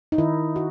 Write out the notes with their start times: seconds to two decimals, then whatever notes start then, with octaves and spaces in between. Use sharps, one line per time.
0.12 D#4
0.18 D#3 E4
0.56 F#4